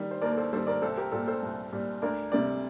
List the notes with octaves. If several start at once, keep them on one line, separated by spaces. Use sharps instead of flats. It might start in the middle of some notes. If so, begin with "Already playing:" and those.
Already playing: D#3 G3 G4
C5
D#2 A#4 D5
A#4
A4 C5
D#3 G3 A4 C5
A#4 D5
C2 A4 C5
G4 A#4
A#2 G3 F4 A4
A4 C5
C2
A#2 G3
D2 A#4 D5
C3 G3 A#4 D5